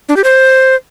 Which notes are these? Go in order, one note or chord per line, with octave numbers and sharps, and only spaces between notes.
D4
G4
C5